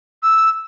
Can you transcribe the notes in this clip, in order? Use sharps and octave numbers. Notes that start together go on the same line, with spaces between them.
E6